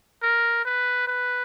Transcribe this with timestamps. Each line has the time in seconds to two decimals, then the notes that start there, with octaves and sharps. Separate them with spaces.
0.22 A#4
0.65 B4
1.07 B4